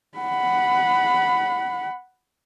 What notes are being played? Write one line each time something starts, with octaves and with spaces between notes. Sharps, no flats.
F#5 B5